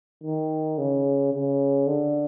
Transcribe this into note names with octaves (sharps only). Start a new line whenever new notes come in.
D#3
C#3
C#3
D3